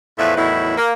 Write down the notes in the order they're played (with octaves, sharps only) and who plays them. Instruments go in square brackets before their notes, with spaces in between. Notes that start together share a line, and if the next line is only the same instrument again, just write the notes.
[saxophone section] E2 A2 F3 A3 B4 E5
E2 A2 D#3 F#3 E4
A#3